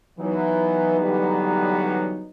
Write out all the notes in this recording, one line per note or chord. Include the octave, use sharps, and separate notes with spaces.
E3 F#3 B3 D#4
D3 E3 G3